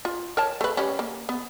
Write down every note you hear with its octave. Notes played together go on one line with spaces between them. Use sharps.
F4
A#4 C#5 A5
A3 B4
G3 C#4
A#3
B3